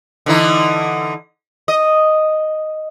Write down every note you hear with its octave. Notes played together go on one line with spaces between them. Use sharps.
D3 E3 D#4
D#5